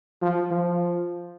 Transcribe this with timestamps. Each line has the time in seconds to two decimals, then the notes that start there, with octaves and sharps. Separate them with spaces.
0.22 F3
0.51 F3